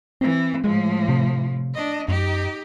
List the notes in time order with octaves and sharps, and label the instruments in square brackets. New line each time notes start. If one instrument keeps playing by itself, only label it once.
[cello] E3 [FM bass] C4
[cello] A2 F3 [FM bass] G#3
[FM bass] C3
[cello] D4 D#5
[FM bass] F#2 [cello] D#4 G4